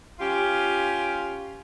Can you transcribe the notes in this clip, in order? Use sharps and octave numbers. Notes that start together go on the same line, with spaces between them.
C#4 F4 G4